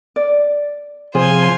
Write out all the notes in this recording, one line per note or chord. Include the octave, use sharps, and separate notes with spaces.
D5
C3 F3 F4 G#4 C5 G#5